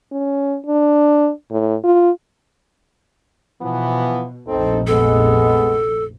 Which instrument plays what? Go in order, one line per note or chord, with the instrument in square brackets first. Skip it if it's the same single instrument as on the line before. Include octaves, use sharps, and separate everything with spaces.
[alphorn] C#4
D4
A2
F4
[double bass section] B2 [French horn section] E3 F3 B3
[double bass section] F1 A#1 [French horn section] C4 D#4 A4
[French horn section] G#3 B3 [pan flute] A4